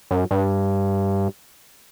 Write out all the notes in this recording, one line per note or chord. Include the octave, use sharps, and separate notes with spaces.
F#2
G2